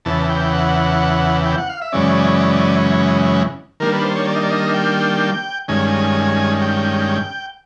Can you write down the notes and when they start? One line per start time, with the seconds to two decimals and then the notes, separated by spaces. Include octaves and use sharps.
0.05 E2 C#3 E3 A5
0.29 G5
0.53 F#5
1.46 G5
1.58 F#5
1.69 F5
1.82 E5
1.92 F#2 C#3 E3 G#3 C#4 D5
3.80 D#3 G3 A#3 D4 A#4
3.93 B4
4.04 C5
4.15 C#5
4.28 D5
4.35 D#5
4.43 D5
4.50 D#5
4.74 G5
5.68 G2 D#3 G#3 C#4 G#5
6.62 G5